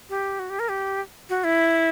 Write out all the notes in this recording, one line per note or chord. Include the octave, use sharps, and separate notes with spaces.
G4
F#4
G4
A#4
G4
F#4
E4